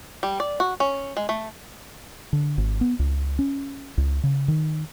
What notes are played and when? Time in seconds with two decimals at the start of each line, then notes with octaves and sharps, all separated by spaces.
0.23 G3
0.40 D5
0.60 F#4
0.80 C#4
1.17 G#3
1.29 A3
2.33 D3
2.58 G#1
2.81 B3
2.99 C#2
3.39 C#4
3.98 C#2
4.24 C#3
4.48 D#3